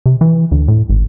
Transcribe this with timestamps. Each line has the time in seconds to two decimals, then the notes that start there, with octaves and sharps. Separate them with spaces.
0.06 C3
0.21 E3
0.52 D2
0.68 A2
0.89 G#1